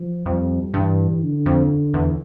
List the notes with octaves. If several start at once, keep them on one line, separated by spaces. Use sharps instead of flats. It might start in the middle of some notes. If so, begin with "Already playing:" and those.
Already playing: F3
F2 G3
G2 E3
D3
F2
E2